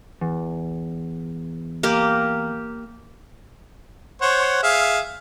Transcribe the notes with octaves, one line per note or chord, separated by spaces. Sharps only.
E2
A#3 G4
C5 C#5 F#5
G#4 E5 F5